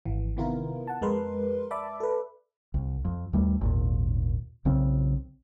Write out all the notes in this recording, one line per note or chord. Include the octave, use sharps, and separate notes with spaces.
G#1 E3
C3 D#3 B3 E4 F4 A#4
F#5 A5
F2 G#3 A#4 B4 C6
D5 E5 A5 B5 D6
A4 B4
C2
F2
D#2 G3 A3
G#1 D#2 A#2
B1 C#3 C4